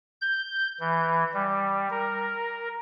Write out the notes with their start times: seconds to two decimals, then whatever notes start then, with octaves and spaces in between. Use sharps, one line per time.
0.21 G6
0.80 E3
1.34 G3
1.90 A#4